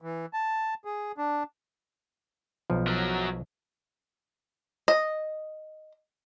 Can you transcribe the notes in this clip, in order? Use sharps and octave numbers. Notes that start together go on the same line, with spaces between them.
E3
A5
G#4
D4
B1 F3
F#3 A#4
D#5